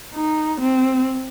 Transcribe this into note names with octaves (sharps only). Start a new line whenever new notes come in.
D#4
C4